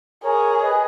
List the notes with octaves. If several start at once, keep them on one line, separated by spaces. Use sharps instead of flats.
G#4 A#4 C#5
B4 D#5